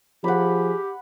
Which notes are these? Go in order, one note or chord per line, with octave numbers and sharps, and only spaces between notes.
F3 G4 G#4 F#5 B5